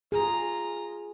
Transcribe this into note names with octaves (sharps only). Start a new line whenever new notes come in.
F4 G#4 A#5